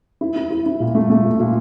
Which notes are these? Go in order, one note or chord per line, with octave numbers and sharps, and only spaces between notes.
E4
E4
E4
E4
A#2
A3
A3
A#2
A#2